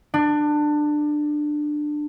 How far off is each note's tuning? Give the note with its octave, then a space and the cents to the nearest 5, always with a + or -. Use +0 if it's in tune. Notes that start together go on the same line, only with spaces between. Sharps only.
D4 +20